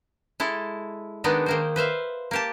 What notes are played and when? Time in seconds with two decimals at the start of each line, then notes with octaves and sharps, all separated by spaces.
0.40 G#3 E4 A4
1.24 D#3 G#3 B3 D4 D#4
1.46 D#3 A#3 C5
1.76 B4 C5 E5 F5
2.31 A#3 G4 A5